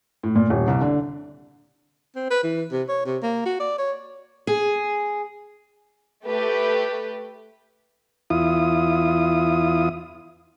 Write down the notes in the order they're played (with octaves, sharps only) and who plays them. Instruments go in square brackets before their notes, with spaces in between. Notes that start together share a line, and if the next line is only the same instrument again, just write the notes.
[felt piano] A2
A#2
D#1
C2
D3
[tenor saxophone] C4
B4
E3
C3
C#5
C3
A#3
F#4
D5
C#5
[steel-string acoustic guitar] G#4
[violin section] A3 G4 B4
[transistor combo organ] E2 E4 F4 D#6